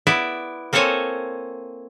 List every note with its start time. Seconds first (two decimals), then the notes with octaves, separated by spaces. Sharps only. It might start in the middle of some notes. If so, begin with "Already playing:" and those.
0.07 B3 E4 D5 E5
0.73 A#3 C4 A4 C5 C#5 G#5